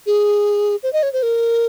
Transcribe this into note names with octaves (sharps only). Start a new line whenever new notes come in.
G#4
C5
D#5
C#5
C5
A#4